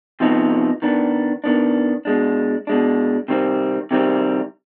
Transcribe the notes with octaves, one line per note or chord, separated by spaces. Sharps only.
C3 F3 B3 D#4
D#3 B3 D4
D#3 B3 D4
B2 G#3 D4
B2 G#3 D4
C3 D#3 G3 C4
C3 D#3 G3 C4